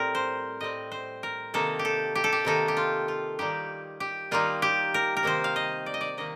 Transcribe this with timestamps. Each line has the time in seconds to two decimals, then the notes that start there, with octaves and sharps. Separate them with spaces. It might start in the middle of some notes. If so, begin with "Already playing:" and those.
Already playing: A2 G3 C4 A#4
0.15 C5
0.60 A2 G3 C4 D#5
0.92 C5
1.23 A#4
1.54 C3 D#3 A#3 D#4 A4
1.79 G4
1.85 A4
2.15 G4
2.24 A4
2.33 G4
2.45 C3 D#3 A#3 D#4 A4
2.68 G4
2.77 F4
3.08 F4
3.39 D#3 G3 A#3 D#4 G4
4.00 G4
4.31 D#3 G3 A#3 D#4 F4
4.62 G4
4.94 A#4
5.17 A#4
5.23 C3 D#3 A#3 D#4 C5
5.44 F5
5.56 D#5
5.86 D5
5.94 D#5
6.01 D5
6.17 C3 D#3 A#3 D#5